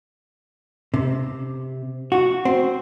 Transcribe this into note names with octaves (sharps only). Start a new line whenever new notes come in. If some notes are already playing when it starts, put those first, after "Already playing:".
C3
F#4
C4